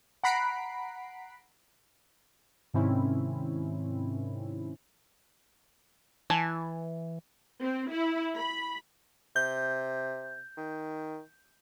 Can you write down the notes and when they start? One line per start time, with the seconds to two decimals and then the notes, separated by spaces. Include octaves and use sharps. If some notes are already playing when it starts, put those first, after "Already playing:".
0.24 F#5 A#5 B5 B6 C7 D7
2.74 G#2 C3 D#3 C4 C#4 E4
6.30 E3 G#5 A5
7.62 C4
7.91 E4
8.37 B5
9.36 C3 G6
10.58 D#3